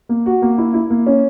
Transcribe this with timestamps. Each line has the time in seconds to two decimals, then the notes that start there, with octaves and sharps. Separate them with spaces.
0.09 A#3
0.26 F#4
0.42 A#3
0.58 E4
0.74 E4
0.90 A#3
1.06 C#4